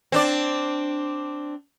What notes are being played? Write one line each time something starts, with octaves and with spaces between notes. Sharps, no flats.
C4 D4 D5